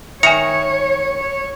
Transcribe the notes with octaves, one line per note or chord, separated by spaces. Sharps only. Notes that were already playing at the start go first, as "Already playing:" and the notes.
D#3 C#5 E5 G#5 A#5 C#7